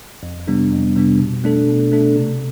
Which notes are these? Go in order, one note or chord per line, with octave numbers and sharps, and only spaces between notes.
F2
C3 G3 B3 D4
F2
C3 G3 B3 D4
B2
A3 D4 A4
B2
A3 D4 A4
C3